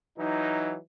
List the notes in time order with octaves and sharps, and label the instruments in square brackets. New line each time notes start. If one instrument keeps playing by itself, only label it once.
[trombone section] E3 F#3 D#4